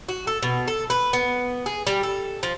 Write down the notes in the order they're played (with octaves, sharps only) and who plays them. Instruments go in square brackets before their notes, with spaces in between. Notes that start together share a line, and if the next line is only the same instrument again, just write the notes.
[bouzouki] F#4
A4
B2
A4
B4
B3
G#4
G3
A4
F3